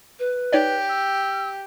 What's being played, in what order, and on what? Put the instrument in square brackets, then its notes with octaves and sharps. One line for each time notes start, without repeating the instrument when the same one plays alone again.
[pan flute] B4
[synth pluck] D#4 C#5 D5 [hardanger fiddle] G4
[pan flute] E6